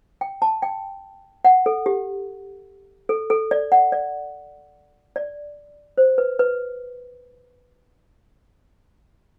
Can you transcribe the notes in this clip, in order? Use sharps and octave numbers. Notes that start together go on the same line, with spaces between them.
G5
A5
G5
F#5
A4
G4
A4
A4
D5
F#5
D5
D5
C5
B4
B4